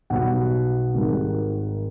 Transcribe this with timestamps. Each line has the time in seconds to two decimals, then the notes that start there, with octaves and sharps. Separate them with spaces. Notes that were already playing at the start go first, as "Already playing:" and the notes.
0.10 B1 B2 G3 F#5
0.94 G#1 G#2 D#3 G3